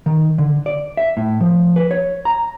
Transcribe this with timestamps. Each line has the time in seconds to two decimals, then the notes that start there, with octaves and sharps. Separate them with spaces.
0.06 D#3
0.38 D3
0.66 D5
0.97 E5
1.17 A2
1.41 F3
1.76 B4
1.91 C#5
2.25 A#5